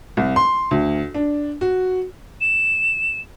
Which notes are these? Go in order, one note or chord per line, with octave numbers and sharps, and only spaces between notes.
C2
C6
D2
D4
F#4
E7